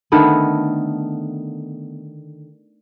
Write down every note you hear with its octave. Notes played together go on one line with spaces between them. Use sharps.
D3 D#3 A3 B3